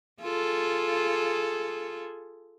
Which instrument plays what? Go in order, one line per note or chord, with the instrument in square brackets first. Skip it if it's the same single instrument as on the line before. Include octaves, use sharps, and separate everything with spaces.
[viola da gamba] F4 G#4 A4